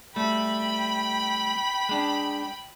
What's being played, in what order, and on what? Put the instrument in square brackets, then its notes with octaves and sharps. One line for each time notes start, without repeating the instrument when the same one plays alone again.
[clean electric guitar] G3 A3 [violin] G5 B5
[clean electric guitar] G#3 D4